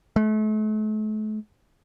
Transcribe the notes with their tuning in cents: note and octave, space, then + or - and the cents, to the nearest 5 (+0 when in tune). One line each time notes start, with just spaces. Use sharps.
A3 -40